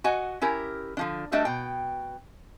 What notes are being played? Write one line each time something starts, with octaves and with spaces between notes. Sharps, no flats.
F#4 D#5 F#5 G#5
C#4 E4 G4 A#4
D3 F3 D4
G3 A3 D4 F#4 D#5 E5
B2 G5